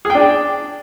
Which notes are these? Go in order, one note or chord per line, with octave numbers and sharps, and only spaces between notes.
G#4
G5
D4